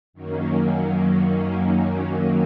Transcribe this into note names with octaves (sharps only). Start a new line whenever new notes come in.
F#2 D#3 F#3 A#3 C#4